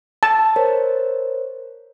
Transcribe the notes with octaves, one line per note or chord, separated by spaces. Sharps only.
A5
A#4 C5 C#5